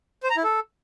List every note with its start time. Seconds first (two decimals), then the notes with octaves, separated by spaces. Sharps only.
0.23 C5
0.30 A#5
0.37 E4
0.44 A4